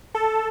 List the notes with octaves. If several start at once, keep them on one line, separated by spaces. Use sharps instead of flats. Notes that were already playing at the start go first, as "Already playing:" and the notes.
A4